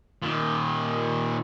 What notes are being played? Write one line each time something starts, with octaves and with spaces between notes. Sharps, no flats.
A#2 D#3